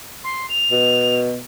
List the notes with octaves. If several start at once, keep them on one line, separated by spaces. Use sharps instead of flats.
C6
F7
B2